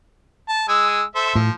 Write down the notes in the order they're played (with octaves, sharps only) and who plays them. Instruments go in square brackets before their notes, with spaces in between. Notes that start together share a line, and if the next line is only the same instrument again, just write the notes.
[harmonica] A5
G#3 G#5 E6
A4 C5 E5
[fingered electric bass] A2 [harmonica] F3